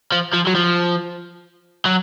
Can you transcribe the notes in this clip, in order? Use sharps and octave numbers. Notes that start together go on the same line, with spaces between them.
F3
F3
F#3
F3
F#3